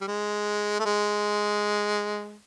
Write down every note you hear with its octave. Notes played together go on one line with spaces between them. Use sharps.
G3
G#3
A3
G#3